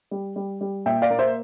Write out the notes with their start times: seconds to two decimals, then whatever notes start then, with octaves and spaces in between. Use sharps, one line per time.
0.11 G3
0.36 G3
0.61 G3
0.86 A#2 E5 G5
1.02 D5 F5
1.10 A#3
1.19 C5 E5